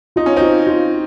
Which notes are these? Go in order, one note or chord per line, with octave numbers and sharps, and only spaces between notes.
D#4 F4
C#4
C4 D#4 F4
F4